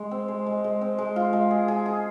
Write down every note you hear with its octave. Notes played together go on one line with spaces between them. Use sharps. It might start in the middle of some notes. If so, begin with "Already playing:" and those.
Already playing: G#3
C4
G#3
G#3
G#3
C4
G#3
F4
G#3
G#4
G#4
G#4